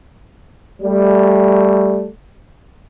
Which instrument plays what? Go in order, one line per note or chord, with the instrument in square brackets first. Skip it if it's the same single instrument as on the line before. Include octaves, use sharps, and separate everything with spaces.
[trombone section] G3 A3